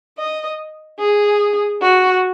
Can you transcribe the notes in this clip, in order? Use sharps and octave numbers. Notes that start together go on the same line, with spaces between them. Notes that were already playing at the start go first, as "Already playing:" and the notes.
D#5
G#4
F#4